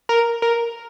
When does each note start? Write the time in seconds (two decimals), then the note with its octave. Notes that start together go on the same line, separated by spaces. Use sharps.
0.09 A#4
0.42 A#4